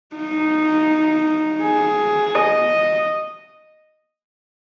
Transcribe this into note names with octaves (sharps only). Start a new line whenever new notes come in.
D#4
G#4
D#5